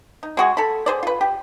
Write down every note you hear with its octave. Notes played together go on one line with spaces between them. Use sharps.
D#4
G#3 F#4 G#4
A4 B5
G#4 C5 D5
F4 B4
G4